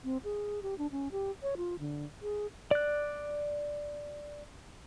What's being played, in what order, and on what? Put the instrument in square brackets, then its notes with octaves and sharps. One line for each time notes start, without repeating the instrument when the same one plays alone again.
[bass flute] C4
G#4
G4
D4
C#4
G4
C#5
F4
D3
G#4
[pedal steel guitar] D5 F#6